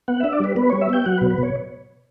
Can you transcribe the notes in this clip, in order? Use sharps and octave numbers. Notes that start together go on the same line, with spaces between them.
B3 F#5
D4 E5
D5
G3 B4
B3 B4
G3 C#5
E5
B3 G5
F#3 F#5
B2 B4
B4
B2 C#5